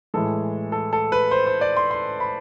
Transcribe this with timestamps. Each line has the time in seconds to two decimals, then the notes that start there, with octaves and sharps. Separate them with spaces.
0.14 A2 E3 G#3 A4
0.72 A4
0.93 A4
1.12 B4
1.31 C5
1.46 C5
1.61 D5
1.77 C6
1.91 C6
2.20 B5